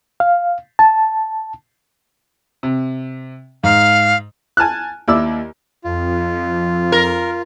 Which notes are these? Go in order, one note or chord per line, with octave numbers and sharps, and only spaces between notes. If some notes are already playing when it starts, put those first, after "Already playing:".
F5
A5
C3
G#2 F5
G#5 A5 F6 F#6
D#2 E4 D5 E6
F2 F4
A#4